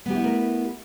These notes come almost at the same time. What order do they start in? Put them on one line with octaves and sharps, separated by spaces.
B3 G4 E4 A3 A#4